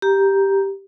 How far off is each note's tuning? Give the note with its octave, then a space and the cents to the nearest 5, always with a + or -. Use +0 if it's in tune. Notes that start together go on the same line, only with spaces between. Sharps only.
G4 +0 A#5 +10